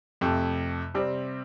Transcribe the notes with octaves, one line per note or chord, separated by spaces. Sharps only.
F2 C3 A3
C3 G3 C4